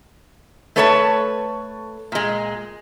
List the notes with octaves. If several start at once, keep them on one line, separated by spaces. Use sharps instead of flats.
A3 A4 B4 C#5 D5 A5
A#2 G#3